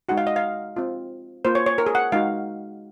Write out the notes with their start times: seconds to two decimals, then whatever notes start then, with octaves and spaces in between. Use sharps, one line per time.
0.09 G#3 D#4 F#4 F#5
0.18 F5
0.27 D#5
0.36 F5
0.76 C4 F4
1.45 A#3 F4 C5
1.55 C#5
1.66 C#5
1.78 A#4
1.86 G#4
1.95 F#5
2.12 G#3 D#4 F#4 F5